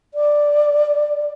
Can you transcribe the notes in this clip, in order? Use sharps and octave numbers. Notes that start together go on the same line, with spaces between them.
D5